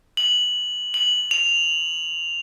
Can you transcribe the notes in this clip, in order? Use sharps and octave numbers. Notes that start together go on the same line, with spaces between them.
F#7
F#7
F7